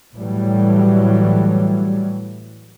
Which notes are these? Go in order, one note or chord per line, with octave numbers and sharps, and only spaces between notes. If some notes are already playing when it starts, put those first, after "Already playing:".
A2 E3 F#3 G3